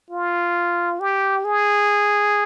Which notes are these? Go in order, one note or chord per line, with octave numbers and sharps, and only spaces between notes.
F4
G4
G#4